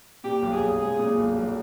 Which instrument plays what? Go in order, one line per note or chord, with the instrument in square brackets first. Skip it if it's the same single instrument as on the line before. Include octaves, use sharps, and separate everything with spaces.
[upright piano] A#2 [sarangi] G4
[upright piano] B1
[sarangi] G#4
[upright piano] B1
[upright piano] G#3 [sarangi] G#4
[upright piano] A#2
B1
B1